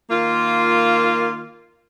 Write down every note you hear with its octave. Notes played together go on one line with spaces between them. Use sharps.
D#3 A#3 F4